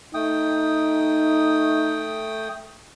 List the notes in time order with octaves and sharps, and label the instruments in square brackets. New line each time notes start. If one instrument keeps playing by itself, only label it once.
[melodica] A3 G5 D#6 [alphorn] D#4